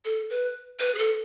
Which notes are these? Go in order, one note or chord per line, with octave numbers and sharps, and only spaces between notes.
A4
B4
B4
G#4
A4